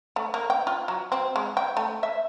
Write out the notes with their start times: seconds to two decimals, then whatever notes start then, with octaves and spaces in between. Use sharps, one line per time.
0.16 A3
0.34 A#3
0.50 G5
0.67 F4
0.88 F#3
1.12 C4
1.36 G#3
1.57 G5
1.77 A3
2.03 E5